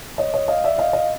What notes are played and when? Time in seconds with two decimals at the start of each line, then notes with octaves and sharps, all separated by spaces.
0.18 C#5 D#5
0.34 C#5 D#5
0.48 D#5 F5
0.64 D5 E5
0.78 D#5 F5
0.93 D#5 F5